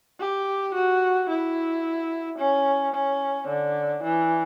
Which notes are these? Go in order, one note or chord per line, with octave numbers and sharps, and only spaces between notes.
G4
F#4
E4
C#4
C#4
D3
E3